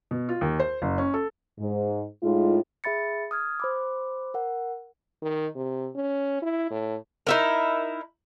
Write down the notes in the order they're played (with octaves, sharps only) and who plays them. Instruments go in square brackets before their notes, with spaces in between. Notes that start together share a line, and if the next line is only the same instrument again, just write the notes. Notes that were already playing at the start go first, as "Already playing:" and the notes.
[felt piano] B2
F4
D#2
C5
F#1
C#4
A4
[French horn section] G#2
A2 G#3 D#4 F4
[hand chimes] G#4 E5 B5 A6 C#7
D#6 F6 G#6
C5 B5 D6
A#4 F#5
[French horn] D#3
C3
C#4
E4
A2
[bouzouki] D#4 E4 A#4